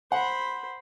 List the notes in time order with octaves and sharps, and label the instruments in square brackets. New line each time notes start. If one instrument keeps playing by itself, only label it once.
[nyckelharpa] C5 B5 [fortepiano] F#5